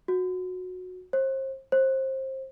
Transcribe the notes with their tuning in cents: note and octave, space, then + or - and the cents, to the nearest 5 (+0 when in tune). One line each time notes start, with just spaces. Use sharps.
F#4 -15
C5 +35
C5 +25